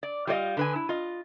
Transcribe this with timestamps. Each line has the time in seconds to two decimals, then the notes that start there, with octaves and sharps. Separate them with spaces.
0.03 D5
0.27 G3 F4 C5 D5 D#5 F5
0.57 D3 B4 G#5
0.76 E4
0.89 F4 D#5